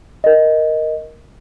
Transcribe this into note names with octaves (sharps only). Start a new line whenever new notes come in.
A#4 D#5